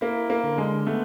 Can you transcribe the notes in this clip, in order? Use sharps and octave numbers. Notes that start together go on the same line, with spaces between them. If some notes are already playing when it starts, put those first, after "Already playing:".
A#3 E4
A#3
D3
G#3
A3 B3